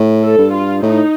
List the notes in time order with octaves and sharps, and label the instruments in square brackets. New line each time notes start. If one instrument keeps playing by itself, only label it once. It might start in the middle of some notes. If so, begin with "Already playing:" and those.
Already playing: [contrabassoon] A2
[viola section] A4
[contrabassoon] G2
[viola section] F4
[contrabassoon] A2 [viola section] D#4